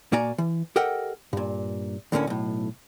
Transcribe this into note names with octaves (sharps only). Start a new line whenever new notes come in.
A#2 A#3 F#4 D5 G#5 A#5
E3
G4 A4 A#4 D#5 F#5 G5
G2 A#2
D2 A2 D3 A#3 C#4
B1 A2